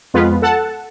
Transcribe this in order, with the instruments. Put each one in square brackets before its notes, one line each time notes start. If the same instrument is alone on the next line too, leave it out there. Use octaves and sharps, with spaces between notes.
[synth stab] F2 G#3 B3 F4 B4
A4 F#5 A5